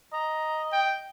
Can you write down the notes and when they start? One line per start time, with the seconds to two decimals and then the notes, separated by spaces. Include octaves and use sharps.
0.13 D#5 A#5
0.72 G5